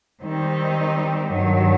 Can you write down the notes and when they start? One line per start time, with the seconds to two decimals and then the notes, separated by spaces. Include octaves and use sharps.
0.21 D#3 G3 C4 D#4
1.29 G2 D#3 F#3